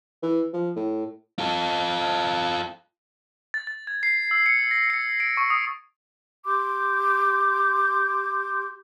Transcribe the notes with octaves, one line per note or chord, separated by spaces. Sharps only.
E3
F3
A2
F4 A4
A6
A6
G#6
C7
E6
C#7
A#6
C#7
D7
C#6
D#6
G4 C6 D6 G6